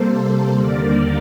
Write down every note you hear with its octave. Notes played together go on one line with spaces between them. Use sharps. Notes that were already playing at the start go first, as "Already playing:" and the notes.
Already playing: C3 G3 A#3 A4 C5
D#2 D3 G3 A#3 A#4 D5